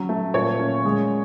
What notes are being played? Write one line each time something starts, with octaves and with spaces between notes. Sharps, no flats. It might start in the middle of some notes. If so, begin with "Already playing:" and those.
Already playing: F#3 C#4
A3
A#2 C#5
C#4
G#3